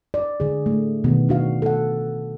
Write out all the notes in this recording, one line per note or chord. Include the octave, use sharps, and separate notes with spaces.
D5
D3 G#4
A3
B2 D#3 B3
D4 F#4 F5
A4 F#5